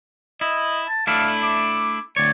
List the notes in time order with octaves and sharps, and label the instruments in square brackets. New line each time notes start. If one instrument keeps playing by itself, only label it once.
[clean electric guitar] E4 [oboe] D#5
[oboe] A5
[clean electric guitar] A3 D4 E4 [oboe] F5
[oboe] D6
[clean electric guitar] D2 C#5 [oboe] D5